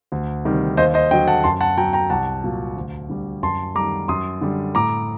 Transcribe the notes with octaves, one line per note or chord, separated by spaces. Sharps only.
D2
C3 D#3 G3
D#2 C5 D#5
C5 D#5
D3 F#3 D#5 G5
F#5 A5
F#2 A5 C6
F#5 A5
F#3 G5 A#5
G5 A#5
C2 F#5 A5
A#2 F#3
D2
D3 G3
F#2 A5 C6
D#3 G3 A#5 D6
F#2 C6 D#6
D3 G3
A2 A#5 D6